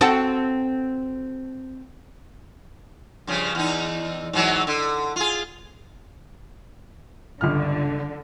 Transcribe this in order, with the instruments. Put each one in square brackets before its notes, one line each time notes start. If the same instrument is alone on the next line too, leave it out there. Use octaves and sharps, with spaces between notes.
[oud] C4 F#4 A4
[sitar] G2 C#3 F3
E2 D#4
G#2 E3 F#3
D3
F4 G#4
[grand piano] G1 C#2 F6 [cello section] D3